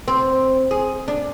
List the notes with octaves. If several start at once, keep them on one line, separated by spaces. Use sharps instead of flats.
C4
G#4
D4